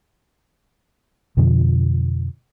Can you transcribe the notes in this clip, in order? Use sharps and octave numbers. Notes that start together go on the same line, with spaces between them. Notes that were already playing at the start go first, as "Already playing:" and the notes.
F2 B2 D3 F3